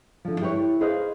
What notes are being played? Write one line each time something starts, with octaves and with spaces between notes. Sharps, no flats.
D3 F3
E4 G4 A#4 B4 C#5
G#4 B4 C5 D#5 F5